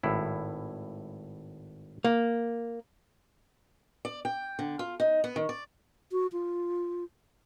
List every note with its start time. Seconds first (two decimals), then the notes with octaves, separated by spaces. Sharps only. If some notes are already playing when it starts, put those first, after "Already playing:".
0.03 G#1 A2 E4
2.04 A#3
4.05 D5
4.25 G5
4.59 D3
4.79 F4
5.00 D#4
5.24 B3
5.36 D#3
5.49 D5
6.12 F#4
6.32 F4